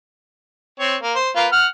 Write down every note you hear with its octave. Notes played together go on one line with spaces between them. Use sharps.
C4 C#5
A#3
C5
A#3 F4 B4
F#5 F6